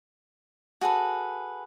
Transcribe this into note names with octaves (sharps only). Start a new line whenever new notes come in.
F#4 G#4 A4 B4